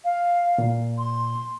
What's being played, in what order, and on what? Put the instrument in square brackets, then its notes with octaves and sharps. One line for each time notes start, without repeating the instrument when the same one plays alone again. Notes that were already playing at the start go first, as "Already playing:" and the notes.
[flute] F5
[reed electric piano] A#2
[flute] C6